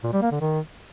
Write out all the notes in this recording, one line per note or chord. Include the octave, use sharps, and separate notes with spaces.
A#2
G3
A#3
D3
D#3